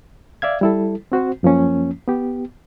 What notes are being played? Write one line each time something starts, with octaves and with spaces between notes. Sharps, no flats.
D5 E5 F5 G#6
G3 E4 A4
C4 F#4 C5
F#2 F3 A#3 C#4
B3 G4